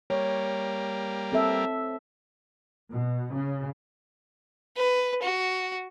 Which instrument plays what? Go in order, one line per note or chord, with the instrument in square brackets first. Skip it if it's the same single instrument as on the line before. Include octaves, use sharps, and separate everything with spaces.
[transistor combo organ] G3 A#3 [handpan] C#5
[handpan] C4 A4 E5
[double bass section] B2
C#3
[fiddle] B4
F#4